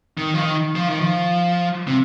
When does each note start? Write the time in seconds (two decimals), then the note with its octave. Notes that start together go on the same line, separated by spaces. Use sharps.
0.18 D#3
0.34 F3
0.40 D#3
0.75 F3
0.88 D#3
1.01 F3
1.87 C3